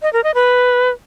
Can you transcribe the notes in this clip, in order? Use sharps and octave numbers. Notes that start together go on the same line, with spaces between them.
D#5
A#4
D#5
B4